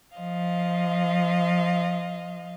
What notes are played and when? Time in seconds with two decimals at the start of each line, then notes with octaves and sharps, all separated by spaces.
0.16 F3 D#5 F5